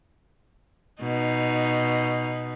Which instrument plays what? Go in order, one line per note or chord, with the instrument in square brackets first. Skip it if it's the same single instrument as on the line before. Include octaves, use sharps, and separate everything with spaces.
[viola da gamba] B2 D#4